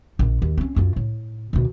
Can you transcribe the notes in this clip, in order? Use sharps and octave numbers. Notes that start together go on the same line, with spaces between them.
A#1
D#2
C4 C#4
F#2 F4
A2
D#2 B2